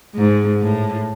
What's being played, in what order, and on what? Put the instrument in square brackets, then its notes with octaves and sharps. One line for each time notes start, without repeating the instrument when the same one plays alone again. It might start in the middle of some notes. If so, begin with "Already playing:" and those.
[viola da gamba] G#2
A2